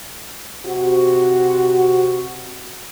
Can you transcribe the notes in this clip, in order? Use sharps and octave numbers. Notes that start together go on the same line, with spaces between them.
C3 F#4